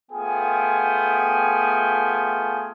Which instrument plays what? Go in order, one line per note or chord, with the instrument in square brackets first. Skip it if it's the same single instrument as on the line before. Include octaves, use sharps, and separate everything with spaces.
[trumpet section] A3 B3 F4 G#4 G5 G#5